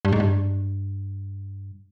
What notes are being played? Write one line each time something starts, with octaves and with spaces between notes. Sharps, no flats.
G2
G#2
G2